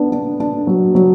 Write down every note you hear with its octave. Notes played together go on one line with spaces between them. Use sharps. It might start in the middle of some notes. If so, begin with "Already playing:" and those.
Already playing: B3 D4
D4
D4
F#3
F#3